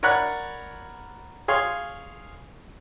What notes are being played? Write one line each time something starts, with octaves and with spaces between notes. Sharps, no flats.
A#4 C#5 D5 F#5 B5 F#6
G#4 C#5 F5 C6